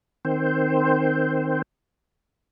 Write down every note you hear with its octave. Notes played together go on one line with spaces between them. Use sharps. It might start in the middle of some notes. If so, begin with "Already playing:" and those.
D#3 C4 C5